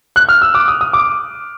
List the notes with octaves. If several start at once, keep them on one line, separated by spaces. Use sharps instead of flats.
F#6
F6
E6
D6
D#6
D#6
D6